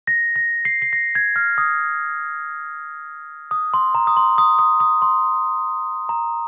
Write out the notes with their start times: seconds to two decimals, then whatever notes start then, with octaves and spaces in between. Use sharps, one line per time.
0.07 A#6
0.36 A#6
0.65 C7
0.82 C7
0.93 A#6
1.15 G#6
1.36 F6
1.58 D#6
3.51 D#6
3.74 C6
3.95 A#5
4.07 D#6
4.17 C6
4.38 D#6
4.59 D#6
4.80 D#6
5.02 C6
6.09 A#5